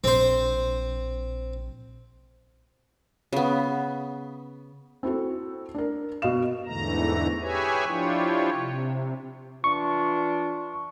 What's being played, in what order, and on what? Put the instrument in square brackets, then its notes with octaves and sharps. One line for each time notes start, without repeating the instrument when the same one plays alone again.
[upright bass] A#1 [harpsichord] C4 C5
[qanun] C#3 B3
[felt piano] C4 E4 F#4 A4
D4 A#4
B2 D#5 F5 E7
[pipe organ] E2 G#2 D3 E3 A3 A#5
G4 G#4 B4 C#5 E5 G#5
F3 D4 E4 F4 G4 C#5
C3
[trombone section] E3 D4 F4 [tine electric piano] C#6